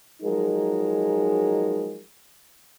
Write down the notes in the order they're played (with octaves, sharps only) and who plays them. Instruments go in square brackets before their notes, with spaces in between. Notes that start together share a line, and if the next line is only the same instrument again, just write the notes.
[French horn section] F3 F#3 G#3 D#4 G#4 A#4